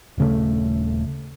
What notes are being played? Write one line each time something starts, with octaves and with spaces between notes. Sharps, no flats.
D#1 C#3 A3